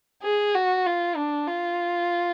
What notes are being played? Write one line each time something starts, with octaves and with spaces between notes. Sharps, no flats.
G#4
F#4
F4
D4
F4